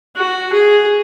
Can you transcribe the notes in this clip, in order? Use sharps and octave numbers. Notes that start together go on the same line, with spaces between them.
F#4
G#4